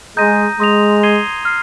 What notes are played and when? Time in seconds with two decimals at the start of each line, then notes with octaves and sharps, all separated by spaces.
0.17 G#3 A#5 D#6 G6 A#6 D#7
0.59 G#3 C6 D#6 A#6 F7
1.03 D#6 G#6 C7 D#7 G7
1.45 F6 C7